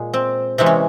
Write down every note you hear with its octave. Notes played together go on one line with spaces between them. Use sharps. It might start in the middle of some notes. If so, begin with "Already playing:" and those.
Already playing: A#2 G#3
C4
C3 E3 G#3 C4
C#4